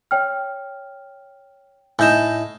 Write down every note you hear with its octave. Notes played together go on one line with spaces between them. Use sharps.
C#5 G5 F6
A2 D#4 G#5 G6 E7